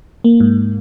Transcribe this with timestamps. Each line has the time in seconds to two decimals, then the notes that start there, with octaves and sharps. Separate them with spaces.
0.24 A#3
0.40 G#2